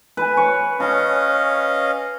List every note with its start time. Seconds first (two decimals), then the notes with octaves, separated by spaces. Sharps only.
0.17 B4 G#5
0.37 C#5
0.80 C#4 D#5 F5 A5